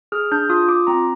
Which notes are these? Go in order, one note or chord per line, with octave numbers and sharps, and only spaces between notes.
G#4 F6
D4 G6
F4 D#6
F4 D6
C4 A#5